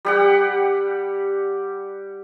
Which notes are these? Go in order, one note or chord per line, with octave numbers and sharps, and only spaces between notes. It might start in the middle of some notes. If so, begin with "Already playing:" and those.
G3 G4 F#5